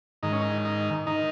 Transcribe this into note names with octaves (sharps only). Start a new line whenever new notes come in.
G#2 D#3 D#4
C#4
D#4
D#4
D#3 D#4